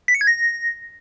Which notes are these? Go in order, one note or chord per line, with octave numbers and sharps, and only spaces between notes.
B6
C#7
G#6
A#6